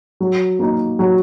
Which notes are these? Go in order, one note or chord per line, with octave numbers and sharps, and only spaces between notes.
F#3
A#3 D#4
F#3